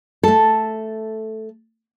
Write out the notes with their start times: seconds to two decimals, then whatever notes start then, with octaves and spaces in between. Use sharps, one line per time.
0.23 A3 A4